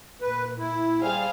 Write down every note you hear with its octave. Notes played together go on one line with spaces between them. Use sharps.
A#2 B4
E4
G3 G#4 C5 F5